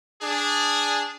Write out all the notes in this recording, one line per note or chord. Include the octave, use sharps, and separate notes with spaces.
D4 G#4